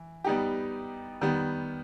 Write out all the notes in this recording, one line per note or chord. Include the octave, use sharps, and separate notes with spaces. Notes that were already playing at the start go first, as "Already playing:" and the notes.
Already playing: E3
G3 B3 D#4 G4
D#3 G3 B3